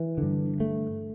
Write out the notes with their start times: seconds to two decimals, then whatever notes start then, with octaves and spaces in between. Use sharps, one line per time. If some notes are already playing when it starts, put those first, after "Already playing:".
Already playing: E3
0.18 G2 D3
0.60 A3